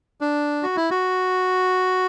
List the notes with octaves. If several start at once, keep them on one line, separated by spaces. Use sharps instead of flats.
D4
F#4
E4
F#4